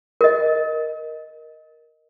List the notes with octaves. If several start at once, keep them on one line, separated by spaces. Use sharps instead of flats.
A#4 D#5